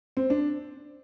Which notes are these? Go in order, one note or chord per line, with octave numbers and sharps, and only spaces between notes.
C4
D4